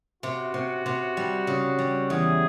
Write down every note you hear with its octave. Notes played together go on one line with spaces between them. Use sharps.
C3 F#4
C3
C3
G3
C#3
G3
E2 G#4